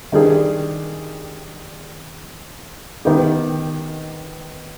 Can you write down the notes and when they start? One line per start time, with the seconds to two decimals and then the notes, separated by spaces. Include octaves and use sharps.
0.12 D#3 G3 D4 G#4
3.05 D#3 B3 D#4 G4